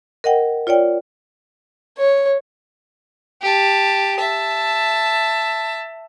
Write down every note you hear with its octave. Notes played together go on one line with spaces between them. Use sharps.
A#4 D#5 F#5 G5
F4 C#5 D5 G5
C#5
G4 A5
E5 A5